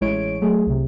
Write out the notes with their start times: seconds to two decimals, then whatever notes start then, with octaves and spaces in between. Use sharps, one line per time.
0.01 A1 G#3 E4 C#5 D7
0.41 F#3 A3 G#4
0.66 C2 C3